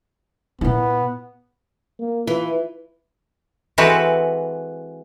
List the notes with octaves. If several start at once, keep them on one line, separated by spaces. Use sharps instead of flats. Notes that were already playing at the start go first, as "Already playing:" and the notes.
A#2 B3 E4
A#3
E3 F4
E3 G#3 C4 F#4 A4 B4